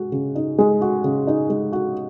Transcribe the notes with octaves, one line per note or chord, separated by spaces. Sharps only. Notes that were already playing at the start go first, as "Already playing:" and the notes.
Already playing: G#3 F#4
C#3
D#4
G#3
F#4
C#3
D#4
G#3
F#4